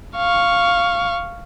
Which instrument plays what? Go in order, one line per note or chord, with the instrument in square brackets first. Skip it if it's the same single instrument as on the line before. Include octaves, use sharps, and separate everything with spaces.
[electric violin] F5 C#6